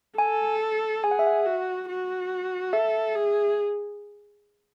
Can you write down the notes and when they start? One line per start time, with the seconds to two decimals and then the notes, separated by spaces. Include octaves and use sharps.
0.18 A4 G#5
1.04 G#4 G#5
1.11 F#5
1.19 E5
1.27 F#5
1.46 F#4
1.88 F#4
2.73 A4 E5
3.15 G#4